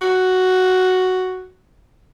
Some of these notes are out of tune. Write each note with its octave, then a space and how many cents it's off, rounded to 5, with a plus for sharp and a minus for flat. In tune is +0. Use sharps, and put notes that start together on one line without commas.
F#4 +5